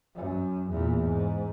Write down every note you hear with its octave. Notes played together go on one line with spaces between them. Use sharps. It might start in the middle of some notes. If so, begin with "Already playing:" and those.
F#2
E2 A#2
G#2